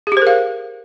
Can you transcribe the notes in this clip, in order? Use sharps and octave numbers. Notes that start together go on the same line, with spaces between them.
G4 G#4 A#4 C5 F5